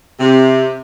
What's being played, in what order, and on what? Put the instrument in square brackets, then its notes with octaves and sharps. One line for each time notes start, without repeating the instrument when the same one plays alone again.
[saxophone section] C3